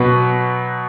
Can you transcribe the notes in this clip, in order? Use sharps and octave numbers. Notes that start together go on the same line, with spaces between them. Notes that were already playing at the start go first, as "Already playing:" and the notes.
Already playing: B2 F#3 B4